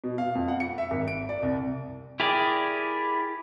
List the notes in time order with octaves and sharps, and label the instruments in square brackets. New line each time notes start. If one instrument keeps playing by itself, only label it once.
[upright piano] B2
F5
F2
F#5
C#7
E5
G#1
D7
D5
C2
[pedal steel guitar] E4 G4 G#4 A#4 D5